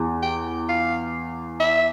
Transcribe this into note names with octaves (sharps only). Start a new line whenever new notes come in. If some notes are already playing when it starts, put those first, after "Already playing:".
Already playing: E2
G5
F5
E5